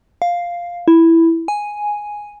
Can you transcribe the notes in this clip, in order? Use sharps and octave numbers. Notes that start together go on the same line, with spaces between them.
F5
E4
G#5